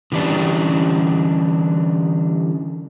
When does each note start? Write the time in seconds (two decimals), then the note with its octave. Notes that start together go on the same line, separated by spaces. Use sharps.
0.12 D3 E3 G3 C#4 D4